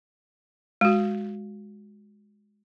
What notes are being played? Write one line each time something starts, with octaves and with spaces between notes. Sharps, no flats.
G#3 F#4